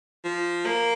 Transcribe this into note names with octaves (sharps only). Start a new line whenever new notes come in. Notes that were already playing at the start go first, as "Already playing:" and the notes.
F3
A#3